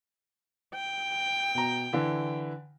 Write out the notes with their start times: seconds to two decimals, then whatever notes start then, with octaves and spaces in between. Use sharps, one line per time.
0.74 G5
1.55 B2 A#5
1.93 D3 E3 E4